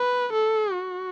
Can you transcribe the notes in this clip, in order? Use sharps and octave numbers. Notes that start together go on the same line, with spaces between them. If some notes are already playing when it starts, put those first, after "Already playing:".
Already playing: B4
A4
F#4